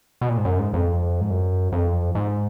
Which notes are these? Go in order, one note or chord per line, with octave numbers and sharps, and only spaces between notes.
B2
A#2
G#2
F#2
G#2
F2
G#2
F#2
F2
G#2